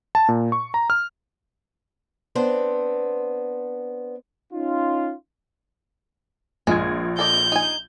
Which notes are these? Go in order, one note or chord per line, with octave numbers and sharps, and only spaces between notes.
A5
A#2
C#6
A#5
F6
B3 C4 D4 C5
C#4 D#4 F4
A#1 G#3 F4 G#6
A4 D5 D#5 G6
D#4 G#5